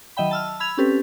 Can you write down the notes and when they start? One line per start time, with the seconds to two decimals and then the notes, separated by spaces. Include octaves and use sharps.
0.17 D#3 F#3 D#5 E5 G5 B5
0.31 A5 E6 F6
0.60 B5 E6 G#6 F7
0.77 C4 C#4 G4 A4 B4